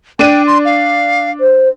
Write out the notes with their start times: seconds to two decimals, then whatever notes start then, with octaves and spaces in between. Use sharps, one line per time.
0.19 D4 G5 D#7
0.47 C6
0.65 F5
1.41 C5